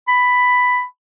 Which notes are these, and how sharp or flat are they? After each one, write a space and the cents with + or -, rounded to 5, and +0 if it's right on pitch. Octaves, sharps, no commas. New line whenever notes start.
B5 +5